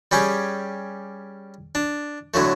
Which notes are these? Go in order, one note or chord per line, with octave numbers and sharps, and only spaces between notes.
G3 C#4 G4 G#4
D4
A2 D3 F#3 A3